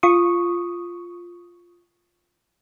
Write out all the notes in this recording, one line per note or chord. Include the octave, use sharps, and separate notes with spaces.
F4 C#6 D#6